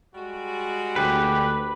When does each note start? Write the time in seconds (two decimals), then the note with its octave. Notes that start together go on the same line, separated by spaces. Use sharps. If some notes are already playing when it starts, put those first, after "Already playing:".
0.15 G3 G#3 F#4
0.96 D2 G4 B4